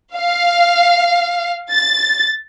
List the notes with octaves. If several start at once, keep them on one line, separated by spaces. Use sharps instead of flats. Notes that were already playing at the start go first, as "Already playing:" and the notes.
F5
A6